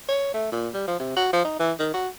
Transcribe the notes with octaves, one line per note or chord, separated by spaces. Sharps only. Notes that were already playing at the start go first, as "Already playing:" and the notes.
C#5
A3
A#2
G3
F3
C3
F#4
F3
D#4
E3
D#3
F#4